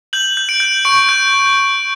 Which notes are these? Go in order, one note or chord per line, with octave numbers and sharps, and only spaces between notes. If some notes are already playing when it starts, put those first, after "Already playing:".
G6 F#7
G6
D7
G6
C#6 D7
G6